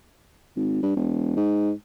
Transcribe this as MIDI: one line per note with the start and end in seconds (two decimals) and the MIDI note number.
0.56 0.81 32
0.83 0.93 43
0.96 1.36 28
1.36 1.71 44